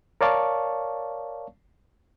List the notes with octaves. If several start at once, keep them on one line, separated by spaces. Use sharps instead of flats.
A#4 C#5 D5 F5 A5 C#6